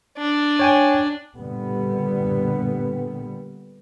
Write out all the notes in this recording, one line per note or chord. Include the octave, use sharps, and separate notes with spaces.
D4
C#5 G5 G#5
A#2 D3 G3 B3